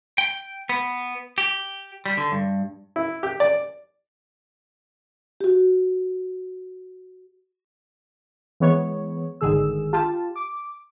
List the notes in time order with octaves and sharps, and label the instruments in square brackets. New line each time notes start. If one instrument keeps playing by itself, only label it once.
[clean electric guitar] G5
B3
G4
G3
D3
G2
[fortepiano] E4
G4
D5
[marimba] F#4 G4
[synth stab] E3 G#3 B3 C#5
G1 G#2 D3 D#3 G#4 E6
F4 G4 A5
D6